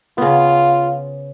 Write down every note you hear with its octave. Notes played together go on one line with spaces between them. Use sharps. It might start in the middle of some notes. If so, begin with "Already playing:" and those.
C#3 B3 F4